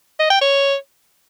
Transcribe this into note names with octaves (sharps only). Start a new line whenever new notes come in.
D#5
G5
C#5